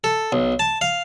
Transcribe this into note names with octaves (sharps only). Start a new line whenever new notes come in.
A4
B1
A5
F5